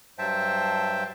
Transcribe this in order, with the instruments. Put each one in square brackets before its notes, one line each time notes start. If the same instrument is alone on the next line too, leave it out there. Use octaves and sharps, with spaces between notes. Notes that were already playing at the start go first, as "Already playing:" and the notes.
[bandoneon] G2 F#3 C5 E5 G5 A5